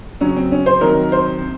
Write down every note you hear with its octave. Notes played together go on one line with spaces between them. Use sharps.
C#3 F#3 C#4
C4
C#4
C5
C3 D#3 F#3 A#4
C5
C3